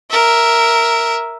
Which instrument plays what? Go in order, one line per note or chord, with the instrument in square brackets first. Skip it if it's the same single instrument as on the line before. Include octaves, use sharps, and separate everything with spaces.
[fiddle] A#4 E5